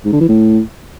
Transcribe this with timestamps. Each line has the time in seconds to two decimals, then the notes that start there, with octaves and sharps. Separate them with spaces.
0.05 G#2
0.13 D3
0.21 E3
0.29 A2